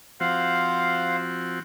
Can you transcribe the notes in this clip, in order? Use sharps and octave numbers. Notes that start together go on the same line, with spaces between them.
F3 C4 F#4 C5 F5 F#5